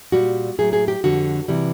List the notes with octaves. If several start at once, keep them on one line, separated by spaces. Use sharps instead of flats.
A#2 G3 F#4
A2 F#3 G#4
G#4
G4
F2 D3 G3 F#4
C3 E3 G3